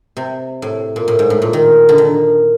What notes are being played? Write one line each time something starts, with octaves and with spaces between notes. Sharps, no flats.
C3
A2
A#2
A2
G#2
A2
A#2
D#3
D3
D#3